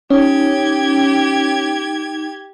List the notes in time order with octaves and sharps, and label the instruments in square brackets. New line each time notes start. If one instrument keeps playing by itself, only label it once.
[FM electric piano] C#4 [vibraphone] D#4 [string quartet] G4 G#6